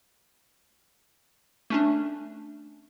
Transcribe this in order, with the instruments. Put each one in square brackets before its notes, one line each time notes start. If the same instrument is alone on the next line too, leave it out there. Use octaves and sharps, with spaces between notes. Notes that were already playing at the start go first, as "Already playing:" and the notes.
[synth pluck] A3 C#4 D4